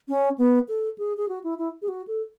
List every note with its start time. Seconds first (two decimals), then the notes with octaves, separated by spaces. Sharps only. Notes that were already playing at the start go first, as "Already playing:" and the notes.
0.08 C#4
0.38 B3
0.68 A4
0.98 G#4
1.17 G#4
1.28 F#4
1.44 E4
1.58 E4
1.82 G#4
1.88 F#4
2.07 A4